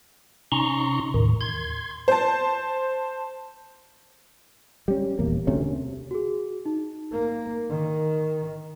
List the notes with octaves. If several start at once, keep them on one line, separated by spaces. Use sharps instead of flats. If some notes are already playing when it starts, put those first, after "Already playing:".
C3 C#4 D#4 A#5 C6 C#6
D#2 A2 D#3
C6 G#6
C5 A5
G3 C#4
D#1 E2 A#3
D2 C3 A3 C#4
F#4 G#4
D#4
A#3
D#3